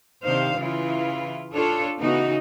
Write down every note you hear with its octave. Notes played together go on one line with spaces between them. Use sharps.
C3 D#3 D4 C5 F5
C#3 E3 E4 F4
D4 F4 A4 C#5
C#3 E3 B3 D#4 F#4